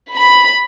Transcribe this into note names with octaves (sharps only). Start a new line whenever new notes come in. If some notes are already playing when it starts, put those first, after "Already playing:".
B5